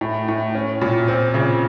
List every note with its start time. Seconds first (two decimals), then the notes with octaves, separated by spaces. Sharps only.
0.01 A2
0.28 A2
0.55 C#4
0.82 A#2
1.08 C4
1.34 C#3